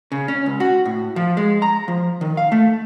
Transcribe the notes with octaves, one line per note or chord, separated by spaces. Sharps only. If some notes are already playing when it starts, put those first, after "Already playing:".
C#3
C#4
C#2
F#4
A2
F3
G#3
A#5
F3
D#3
F5
A3